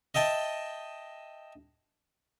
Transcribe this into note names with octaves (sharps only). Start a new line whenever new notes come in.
D#5 E5 G5 A5